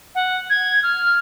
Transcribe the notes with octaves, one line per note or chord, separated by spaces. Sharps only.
F#5
G#6
F6